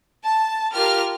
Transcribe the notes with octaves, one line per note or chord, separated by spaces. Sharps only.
A5
F4 G4 A#4 F6